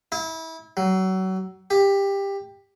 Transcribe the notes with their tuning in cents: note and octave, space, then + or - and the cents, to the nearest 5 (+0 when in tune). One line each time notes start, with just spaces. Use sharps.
E4 -30
F#3 +30
G4 +15